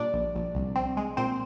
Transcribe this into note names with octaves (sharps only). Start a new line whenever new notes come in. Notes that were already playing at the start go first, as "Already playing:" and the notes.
Already playing: A#2 G3 D4 D5
A#1
A#1
C2
C4
G#3
A#2 C4 C5